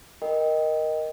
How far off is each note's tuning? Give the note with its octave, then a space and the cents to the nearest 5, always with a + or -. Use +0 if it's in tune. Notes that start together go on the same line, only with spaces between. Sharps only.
A#4 +5 D#5 +0 G5 +0